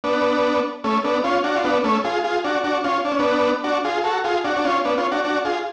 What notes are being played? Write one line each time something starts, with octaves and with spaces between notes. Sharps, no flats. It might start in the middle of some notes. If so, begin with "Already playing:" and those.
B3 D4
A3 C#4
B3 D4
C#4 F4
D4 F#4
F4
B3 D4
A3 C#4
F4 G#4
F4 G#4
D4 F#4
D4 F#4
C#4 F4
D4
C#4
B3 D4
D4 F#4
F4 G#4
F#4 A4
F4 G#4
D4 F#4
D4
C#4 F4
B3 D4
C#4 F4
D4 F#4
D4 F#4
F4 G#4